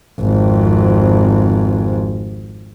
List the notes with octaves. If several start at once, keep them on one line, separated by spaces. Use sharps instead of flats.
G#1 F2